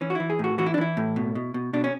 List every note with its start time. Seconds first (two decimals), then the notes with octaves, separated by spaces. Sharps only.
0.01 E3 C#4
0.10 F#4
0.15 E3 E4
0.30 G#4
0.39 A2 F#4
0.58 E3 F#4
0.66 E4
0.74 D4
0.78 E3 E4
0.97 A2
1.16 B2
1.35 B2
1.54 B2
1.73 B2 D4
1.84 C#4